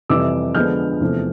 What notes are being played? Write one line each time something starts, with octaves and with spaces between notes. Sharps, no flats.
F2 C3 E3 G3 D6 E6
D3 F3 G#3 B3 D4 F6 G6
E2 C3 F3 A3